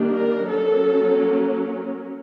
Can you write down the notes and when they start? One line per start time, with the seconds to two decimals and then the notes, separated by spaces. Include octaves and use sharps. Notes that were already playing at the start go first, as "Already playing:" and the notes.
Already playing: D#3 G3 A#3 D4
0.11 A#4
0.50 F#3 A#3 C#4 A4